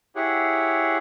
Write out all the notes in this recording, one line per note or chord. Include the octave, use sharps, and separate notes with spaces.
E4 G4 G#4 C#5 F#5